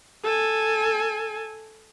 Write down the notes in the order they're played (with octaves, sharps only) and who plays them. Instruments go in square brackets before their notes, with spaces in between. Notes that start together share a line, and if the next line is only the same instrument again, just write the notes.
[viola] A4 G#5